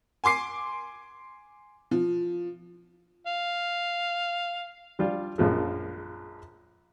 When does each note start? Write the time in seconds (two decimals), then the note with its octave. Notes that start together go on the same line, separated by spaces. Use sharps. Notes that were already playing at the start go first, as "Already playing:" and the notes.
0.24 G#5 C6 D6 C7
1.91 F3
3.27 F5
4.99 F3 G3 D4 F4
5.38 A#1 F#2 F3 G#3